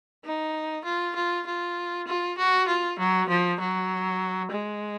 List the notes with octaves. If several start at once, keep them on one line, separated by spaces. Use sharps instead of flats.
D#4
F4
F4
F4
F4
F#4
F4
F#3
F3
F#3
G#3